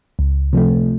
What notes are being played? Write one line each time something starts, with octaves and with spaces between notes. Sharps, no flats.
C#2
C3 F3 A3